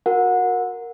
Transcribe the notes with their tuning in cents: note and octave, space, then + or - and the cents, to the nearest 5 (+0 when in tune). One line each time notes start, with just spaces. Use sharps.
F#4 -20 A#4 +0 F#5 -25